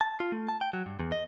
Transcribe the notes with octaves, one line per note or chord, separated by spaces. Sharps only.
A5
F4
A3
A5
G5
F#3
G2
E2
D#5